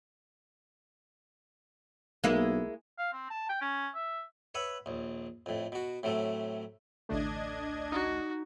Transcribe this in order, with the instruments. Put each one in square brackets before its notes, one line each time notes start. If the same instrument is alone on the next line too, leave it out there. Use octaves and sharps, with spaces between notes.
[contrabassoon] B1 [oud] G#3 A#3 E4
[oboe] F5
C4
A5
G5
C#4
E5
[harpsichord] B4 C#5 E5 F#5
A#1 D#2
F2 A2
B2 F#4
A2 C3 F#3 A3
[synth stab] A1 D2 A3 [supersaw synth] D4 D#5 G#6
[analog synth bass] D#4 [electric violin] F#4